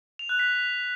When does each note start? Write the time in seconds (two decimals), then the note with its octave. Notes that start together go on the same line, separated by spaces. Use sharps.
0.19 F7
0.29 F#6
0.39 B6